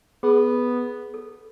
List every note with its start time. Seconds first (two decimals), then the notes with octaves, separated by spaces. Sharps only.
0.23 B3 G#4
1.14 A4